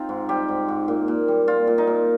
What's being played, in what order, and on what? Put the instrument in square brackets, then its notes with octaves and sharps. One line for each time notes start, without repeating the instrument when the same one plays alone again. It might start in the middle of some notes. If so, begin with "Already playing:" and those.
Already playing: [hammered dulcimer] C4 D#4 F4
G#2
G3 G4
G#2
G#2
A#2
A#2
G3
A#2 F4
A#2
D#4
A#2